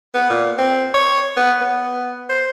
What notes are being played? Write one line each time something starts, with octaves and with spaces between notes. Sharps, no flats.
B3
A#2
C4
C#5
B3
B3
C5